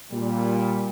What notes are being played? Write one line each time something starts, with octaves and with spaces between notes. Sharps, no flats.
A#2 G3